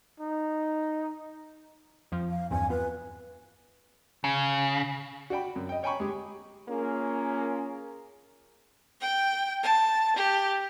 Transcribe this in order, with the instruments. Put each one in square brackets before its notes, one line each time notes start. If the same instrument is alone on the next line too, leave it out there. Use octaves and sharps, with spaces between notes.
[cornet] D#4
[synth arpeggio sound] F2 F3
[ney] F5
[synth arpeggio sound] E2 G2 C4 [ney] G#5
[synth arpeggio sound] B3 F4 [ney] B4
[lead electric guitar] C#3
[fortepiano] F#4 D5 G5 B5
F#2
D#5 G5
C#5 G5 G#5 A#5 B5 C#6
G#3 G4
[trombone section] A#3 C#4 F4 G#4 A#4
[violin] G5
A5
G4